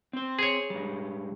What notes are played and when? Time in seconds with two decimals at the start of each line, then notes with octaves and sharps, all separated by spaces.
0.13 C4 C5
0.39 G#4 C#5
0.70 G#2 G3